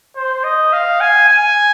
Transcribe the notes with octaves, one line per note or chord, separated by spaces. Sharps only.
C5
D#5
F5
G#5
G#5